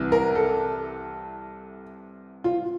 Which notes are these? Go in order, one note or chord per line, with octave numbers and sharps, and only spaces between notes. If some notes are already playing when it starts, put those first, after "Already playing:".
Already playing: C2 C3 E3
A#4
A4
F4